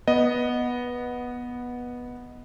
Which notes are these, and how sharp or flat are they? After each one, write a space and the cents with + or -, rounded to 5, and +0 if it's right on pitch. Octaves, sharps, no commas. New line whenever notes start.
B3 -10 D#5 +0